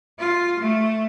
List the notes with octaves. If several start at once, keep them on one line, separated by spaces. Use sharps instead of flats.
F4
A3